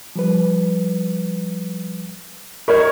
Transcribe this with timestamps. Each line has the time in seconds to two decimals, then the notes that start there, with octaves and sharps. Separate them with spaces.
0.16 F3 G3 B4
2.68 A#4 C#5 D#5 B5 C#6